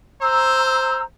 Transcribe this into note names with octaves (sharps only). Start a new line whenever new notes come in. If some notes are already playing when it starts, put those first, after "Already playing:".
C5 A#5 E6